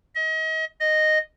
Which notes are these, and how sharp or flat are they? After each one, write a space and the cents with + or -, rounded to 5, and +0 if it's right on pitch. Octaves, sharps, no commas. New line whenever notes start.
D#5 +35
D#5 -10